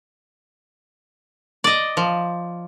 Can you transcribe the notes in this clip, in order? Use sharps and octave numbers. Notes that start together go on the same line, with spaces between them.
D5 D#5
F3